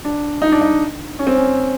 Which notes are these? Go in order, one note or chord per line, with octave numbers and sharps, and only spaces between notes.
D4
D#4
D4
D#4
C#4
C4
C#4